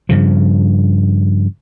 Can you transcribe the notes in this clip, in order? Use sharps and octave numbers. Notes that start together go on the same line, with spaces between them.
G2 C#3 F3